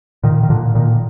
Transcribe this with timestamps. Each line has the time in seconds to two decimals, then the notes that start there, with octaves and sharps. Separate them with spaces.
0.23 A#2 D#3
0.43 D#3
0.50 A#2 D3
0.75 A#2 D#3